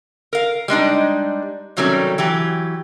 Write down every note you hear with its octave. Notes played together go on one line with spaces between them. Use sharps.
A#4 F5
G3 G#3 D4 D#4
C3 D#3 F#3 G3 A3 C#4
E3 F#3 G4